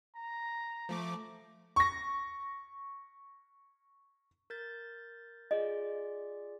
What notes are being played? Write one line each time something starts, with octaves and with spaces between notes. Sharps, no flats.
A#5
F3 A3 D6
C#6 A#6
A#4 G6 A6
F4 G#4 D5 D#5